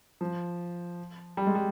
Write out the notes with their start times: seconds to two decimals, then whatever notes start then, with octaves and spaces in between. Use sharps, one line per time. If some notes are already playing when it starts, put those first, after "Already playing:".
0.21 F3
1.37 G3
1.47 G#3
1.55 G3